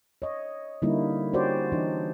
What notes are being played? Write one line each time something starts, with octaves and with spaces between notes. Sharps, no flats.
C#5 D#5
D3 G3 A#3 D#4 E4
C#4 F#4 G4 C5 D5
E3 D4 D#4